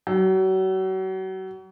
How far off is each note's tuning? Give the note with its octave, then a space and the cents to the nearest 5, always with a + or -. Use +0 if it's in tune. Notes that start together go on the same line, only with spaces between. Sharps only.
F#3 +35